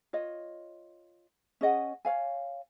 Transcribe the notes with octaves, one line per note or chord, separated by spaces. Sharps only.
F4 C#5 D#5
C#4 G#4 D#5 F#5
C#5 F5 G#5